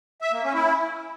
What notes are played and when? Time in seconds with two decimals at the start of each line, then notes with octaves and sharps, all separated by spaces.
0.22 E5
0.32 A#3
0.43 C#4
0.54 E4